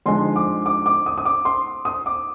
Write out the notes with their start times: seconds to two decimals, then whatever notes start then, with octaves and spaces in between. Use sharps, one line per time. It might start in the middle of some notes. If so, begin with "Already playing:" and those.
0.06 F2 D3 G#3 D#4 C6
0.36 D6
0.66 D6
0.86 D6
1.06 D#6
1.18 D#6
1.25 D6
1.45 C6
1.85 D#6
2.06 D6